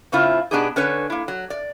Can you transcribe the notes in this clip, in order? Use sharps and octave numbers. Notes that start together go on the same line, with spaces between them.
A2 C#3 C4 E4 F4
B2 B3 D4 D#4 G4 G#4
D3 C#4 B4 C#5
A#3 E4
F#3
D5